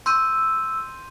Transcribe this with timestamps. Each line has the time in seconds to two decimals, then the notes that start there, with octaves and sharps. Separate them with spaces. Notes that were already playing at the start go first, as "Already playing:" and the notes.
0.06 C6 E6 G6 D#7